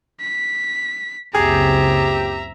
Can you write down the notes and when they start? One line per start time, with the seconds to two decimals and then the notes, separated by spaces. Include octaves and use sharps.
0.21 B6
1.35 F#1 C#2 C4 G4 G#4 E5 A#5